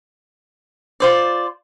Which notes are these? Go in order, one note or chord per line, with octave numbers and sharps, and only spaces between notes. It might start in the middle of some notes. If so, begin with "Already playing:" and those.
F4 C5 D5